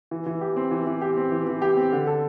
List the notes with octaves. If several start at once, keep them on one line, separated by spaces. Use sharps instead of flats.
E3
E3
G4
C4
E3
E3
G4
C4
E3
E3
G4
C4
D3
A4